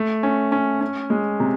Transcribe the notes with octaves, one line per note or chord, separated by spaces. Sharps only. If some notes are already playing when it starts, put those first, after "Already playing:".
Already playing: A3
C#4
C#4
C#4
G#3
C3